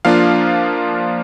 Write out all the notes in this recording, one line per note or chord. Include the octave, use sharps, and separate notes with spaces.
F3 A#3 D4 F4 F5